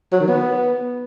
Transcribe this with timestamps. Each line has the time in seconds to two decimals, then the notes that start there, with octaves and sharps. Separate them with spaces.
0.13 F#3
0.20 D#3
0.28 B3